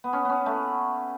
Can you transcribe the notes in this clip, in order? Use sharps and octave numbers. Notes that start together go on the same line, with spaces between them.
B3
C#4
B3 C#4
A3